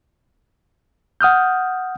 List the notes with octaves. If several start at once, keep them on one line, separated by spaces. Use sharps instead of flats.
F#5 D#6 F6 G6